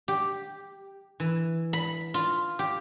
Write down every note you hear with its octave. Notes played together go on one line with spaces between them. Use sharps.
G4
E3
B5
F4
G4